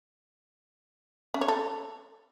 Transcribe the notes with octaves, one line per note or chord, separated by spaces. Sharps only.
C#4
C#5
A4